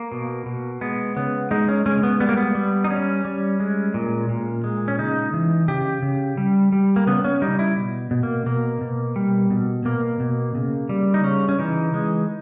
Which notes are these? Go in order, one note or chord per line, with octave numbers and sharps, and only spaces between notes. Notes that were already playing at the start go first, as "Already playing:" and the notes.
Already playing: A#3
B2
B2
G#3 B3
C#3 B3
G#3 D#4
C#4
G#3 C#4
B3
G3 B3
A#3
B3
G3
D#4
G3 C#4
G3
G#3
A#2
A#2
G#3
C#4
C#3 D#4
E3
C#3 G4
C#3
G3
G3
A#3
C#3 B3
C#4
G3 D#4
E4
B2
B2
A#3
B2 A#3
B2
G3
B2
B2 A#3
B2
C#3
G3
D#4
C#3 C#4
C#4
E3 D#4
G#3